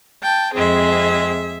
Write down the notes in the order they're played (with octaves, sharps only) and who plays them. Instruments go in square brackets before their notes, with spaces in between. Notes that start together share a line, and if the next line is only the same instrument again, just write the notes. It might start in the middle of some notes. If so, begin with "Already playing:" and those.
[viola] G5 [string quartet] A5
[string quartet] F2 G#3 C4 [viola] G#4 E5